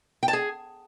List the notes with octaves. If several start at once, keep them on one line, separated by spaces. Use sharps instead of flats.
G5
A5
G#4